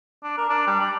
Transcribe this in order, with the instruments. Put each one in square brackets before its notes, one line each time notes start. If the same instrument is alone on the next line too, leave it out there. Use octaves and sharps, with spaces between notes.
[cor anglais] D4
A#4
D4
G3
D5